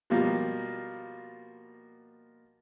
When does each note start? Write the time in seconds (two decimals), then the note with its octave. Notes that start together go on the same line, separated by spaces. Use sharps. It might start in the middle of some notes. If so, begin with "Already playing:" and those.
0.10 B2 F3 G3 A#3